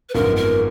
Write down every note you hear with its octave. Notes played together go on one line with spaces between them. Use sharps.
B4
G#1 F#2 F3 G#3 B3 A#4
A#4